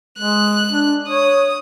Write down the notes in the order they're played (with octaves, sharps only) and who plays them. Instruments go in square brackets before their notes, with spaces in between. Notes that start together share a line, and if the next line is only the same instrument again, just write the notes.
[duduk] G#3 [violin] F#6
[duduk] D4
[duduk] C#5 [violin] D#6